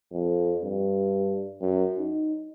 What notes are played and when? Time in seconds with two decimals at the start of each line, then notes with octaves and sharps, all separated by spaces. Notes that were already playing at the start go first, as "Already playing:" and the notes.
0.12 F2
0.64 G2
1.61 F#2
1.98 D#4